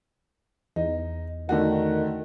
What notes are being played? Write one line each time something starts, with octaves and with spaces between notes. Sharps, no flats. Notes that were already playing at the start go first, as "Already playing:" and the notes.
E2 D#4
D3 D#3 A3 F#4